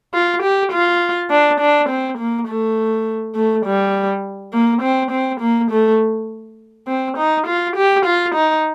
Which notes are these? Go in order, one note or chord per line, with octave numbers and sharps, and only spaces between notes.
F4
G4
F4
D4
D4
C4
A#3
A3
A3
G3
A#3
C4
C4
A#3
A3
C4
D#4
F4
G4
F4
D#4